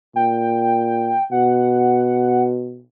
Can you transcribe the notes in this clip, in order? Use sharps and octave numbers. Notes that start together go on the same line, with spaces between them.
A#2 G5
B2 F#5